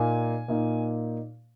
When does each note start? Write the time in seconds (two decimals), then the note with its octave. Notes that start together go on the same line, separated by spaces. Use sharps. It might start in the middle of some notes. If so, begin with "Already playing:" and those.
Already playing: A#2 A#3 D#4 G#5
0.48 A#2 A#3 D#4